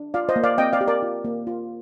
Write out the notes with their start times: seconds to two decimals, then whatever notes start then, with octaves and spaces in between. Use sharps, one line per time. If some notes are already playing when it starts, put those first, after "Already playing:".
Already playing: D4
0.14 F4 D5 F5
0.29 C5 D#5
0.36 A#3
0.44 D5 F5
0.58 C4 D#5 G5
0.73 D5 F5
0.81 G4
0.87 A#4 D5
1.03 F4
1.24 A#3
1.47 F4